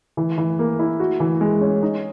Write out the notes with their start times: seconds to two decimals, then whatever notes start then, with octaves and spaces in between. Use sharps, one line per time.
0.17 E3
0.38 E3
0.59 A#3
0.79 E4
1.00 F#4
1.20 E3
1.41 G#3
1.61 C#4
1.83 D#4